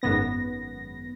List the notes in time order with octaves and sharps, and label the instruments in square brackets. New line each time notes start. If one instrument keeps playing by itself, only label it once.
[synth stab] G#1 F#2 B3 A#6